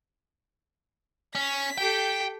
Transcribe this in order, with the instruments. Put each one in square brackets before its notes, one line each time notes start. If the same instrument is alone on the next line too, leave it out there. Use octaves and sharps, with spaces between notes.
[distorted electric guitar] C#4 [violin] B6
[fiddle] G4 A4 [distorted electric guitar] G5